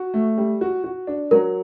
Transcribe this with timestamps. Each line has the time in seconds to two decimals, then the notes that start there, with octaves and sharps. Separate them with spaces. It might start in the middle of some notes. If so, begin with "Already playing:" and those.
Already playing: F#4
0.14 A3
0.37 G3
0.61 F#4
0.84 F#4
1.07 D4
1.31 F#3 A#4